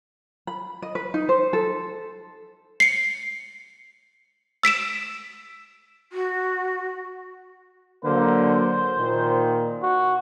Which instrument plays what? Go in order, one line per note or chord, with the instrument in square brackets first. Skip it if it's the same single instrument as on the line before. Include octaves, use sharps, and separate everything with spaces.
[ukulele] B5
D#5
B4
D#4
C5
A4
[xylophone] C7 C#7
E6 B6 D7 E7
[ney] F#4
[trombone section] D3 F#3 A#3 [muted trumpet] C5
[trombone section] A#2 D#3
[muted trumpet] F#4